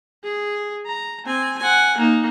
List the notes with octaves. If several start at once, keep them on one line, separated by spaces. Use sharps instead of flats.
G#4
A#5
C4 G#5
F#5 G#5
A#3 D#4